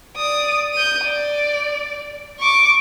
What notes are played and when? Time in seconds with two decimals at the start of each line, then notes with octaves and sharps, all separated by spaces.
0.17 D5 D#6
0.74 G6 D#7
1.04 D5
2.39 C#6 D6